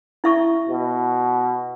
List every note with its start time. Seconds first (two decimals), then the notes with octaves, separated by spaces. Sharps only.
0.24 E4 E5 C#6
0.68 B2